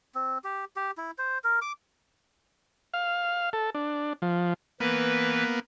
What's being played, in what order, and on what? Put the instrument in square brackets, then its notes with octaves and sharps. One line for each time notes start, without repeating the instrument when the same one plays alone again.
[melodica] C4
G4
G4
E4
C5
A#4
D6
[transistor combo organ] F5
A4
D4
F3
[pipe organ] E3 B4 [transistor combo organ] A#3 B3